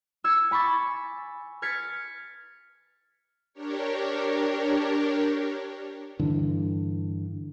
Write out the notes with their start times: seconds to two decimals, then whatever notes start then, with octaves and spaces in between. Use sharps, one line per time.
0.24 E6 G#6 C#7
0.51 G#5 B5 C#6 D6 A6
1.62 F6 G#6 A6 B6 C#7
3.53 D4 G4 A#4 C#5
6.19 G2 D3 E3